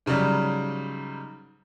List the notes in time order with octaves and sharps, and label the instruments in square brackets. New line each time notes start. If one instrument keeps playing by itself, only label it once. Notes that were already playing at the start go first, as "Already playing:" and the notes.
[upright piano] G#2 C#3 F#3 G3